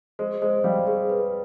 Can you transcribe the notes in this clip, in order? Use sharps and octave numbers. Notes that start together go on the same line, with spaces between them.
G#3 C5
G#3 C5
G3 F5
G#4
B4